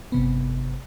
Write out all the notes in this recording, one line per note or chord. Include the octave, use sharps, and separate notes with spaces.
G1 C3 B3